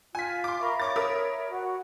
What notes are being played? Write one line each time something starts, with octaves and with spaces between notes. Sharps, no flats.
F4 G#5 B6
C6 D6
A#4 E5 F5 B5 C#6
C#5 C#6 D6 A6
A#4 E5 B5 D#6
F#4